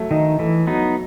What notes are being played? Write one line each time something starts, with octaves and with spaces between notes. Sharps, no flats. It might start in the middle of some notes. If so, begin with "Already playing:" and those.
Already playing: F#3 A3
D#3 D#4
E3 A3
F#3 B3 D#4